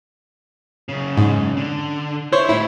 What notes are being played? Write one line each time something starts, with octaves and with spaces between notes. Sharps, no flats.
F#2 C#3
G#2
D3
E4 C5 C#5 E5
A2 E4